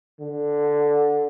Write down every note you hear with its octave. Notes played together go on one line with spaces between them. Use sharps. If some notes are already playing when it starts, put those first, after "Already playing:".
D3